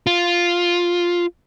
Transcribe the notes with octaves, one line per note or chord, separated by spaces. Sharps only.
F4